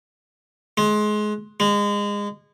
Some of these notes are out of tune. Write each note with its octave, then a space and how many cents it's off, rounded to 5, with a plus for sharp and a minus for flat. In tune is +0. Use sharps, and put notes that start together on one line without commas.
G#3 +25
G#3 -25